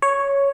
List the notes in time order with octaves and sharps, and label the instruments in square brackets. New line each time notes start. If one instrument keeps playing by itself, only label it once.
[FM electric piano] C#5